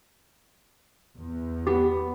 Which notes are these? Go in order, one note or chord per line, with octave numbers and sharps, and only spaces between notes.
E2
B3 G4